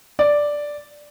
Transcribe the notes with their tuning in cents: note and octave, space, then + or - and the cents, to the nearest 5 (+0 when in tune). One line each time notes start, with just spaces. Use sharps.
D5 +0